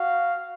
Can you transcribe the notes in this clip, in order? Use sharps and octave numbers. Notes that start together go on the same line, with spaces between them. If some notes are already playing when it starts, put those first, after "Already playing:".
Already playing: F#4 F5